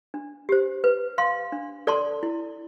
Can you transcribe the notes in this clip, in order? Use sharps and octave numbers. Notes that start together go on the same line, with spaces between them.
D4
G4 C5
B4
F5 C6
D4
A4 D5 A5 C6
E4